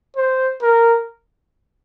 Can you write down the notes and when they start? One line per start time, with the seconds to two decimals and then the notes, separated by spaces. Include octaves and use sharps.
0.16 C5
0.62 A#4